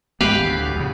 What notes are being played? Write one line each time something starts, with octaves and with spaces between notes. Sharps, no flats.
G#1 G#3 B3 G4 B4 F5
D2 A2
E2 C#3